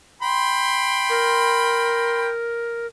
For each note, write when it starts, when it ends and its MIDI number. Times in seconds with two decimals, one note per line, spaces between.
0.22 2.30 79
0.22 2.30 83
0.22 2.30 84
1.10 2.87 70